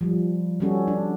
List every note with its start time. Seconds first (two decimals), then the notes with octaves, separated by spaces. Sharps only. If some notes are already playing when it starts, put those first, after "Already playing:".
0.01 F3 G3
0.60 G3 B3 C#4 F#4 A4
0.87 D4